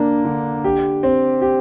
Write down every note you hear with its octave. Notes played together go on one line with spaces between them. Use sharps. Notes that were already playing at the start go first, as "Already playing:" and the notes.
Already playing: D3 A#3 D4
D3
G4
C4
G4